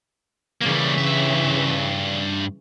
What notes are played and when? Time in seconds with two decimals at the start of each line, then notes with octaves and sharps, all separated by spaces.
0.62 C#3 E3 G3 A#3
0.97 G2 E5